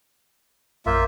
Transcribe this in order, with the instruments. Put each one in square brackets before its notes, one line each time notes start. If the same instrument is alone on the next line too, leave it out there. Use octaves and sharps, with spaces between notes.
[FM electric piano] A#1 F#2 G6 [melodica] A#3 F4 E5